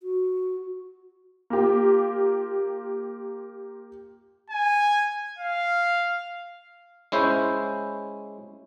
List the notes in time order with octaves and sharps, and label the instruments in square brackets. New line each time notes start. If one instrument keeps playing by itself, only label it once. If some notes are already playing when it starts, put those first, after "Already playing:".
[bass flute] F#4
[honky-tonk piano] A#3 F4 G4
[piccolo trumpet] G#5
F5
[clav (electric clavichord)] G#3 C#4 E4 C5